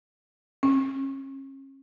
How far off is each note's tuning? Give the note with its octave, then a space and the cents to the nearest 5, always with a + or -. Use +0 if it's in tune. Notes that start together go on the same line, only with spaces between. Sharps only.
C#4 -35